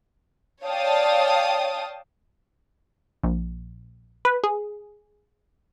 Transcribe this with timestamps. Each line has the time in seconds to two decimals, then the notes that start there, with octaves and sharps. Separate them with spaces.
0.63 C#5 D5 F5 G5 A5 D#6
3.24 A#1
4.25 B4
4.44 G#4